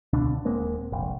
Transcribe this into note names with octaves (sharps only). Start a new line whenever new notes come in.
C#2 B2 D3 D4
D#1 G#3 A#3 C4
F1 A#1